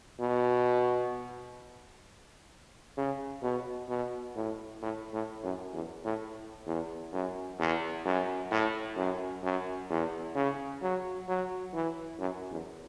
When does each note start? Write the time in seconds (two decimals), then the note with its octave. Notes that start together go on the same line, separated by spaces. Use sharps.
0.20 B2
2.97 C#3
3.43 B2
3.89 B2
4.36 A2
4.82 A2
5.13 A2
5.44 F#2
5.74 E2
6.05 A2
6.67 E2
7.13 F#2
7.59 E2
8.05 F#2
8.51 A2
8.97 F#2
9.43 F#2
9.90 E2
10.35 C#3
10.82 F#3
11.28 F#3
11.74 E3
12.19 F#2
12.51 E2